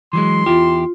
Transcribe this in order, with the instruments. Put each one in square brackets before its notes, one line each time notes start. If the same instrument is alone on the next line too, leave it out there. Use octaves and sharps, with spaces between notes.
[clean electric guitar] E3 F#3 G#3 [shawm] C6
[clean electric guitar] E2 E4 G4 [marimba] F4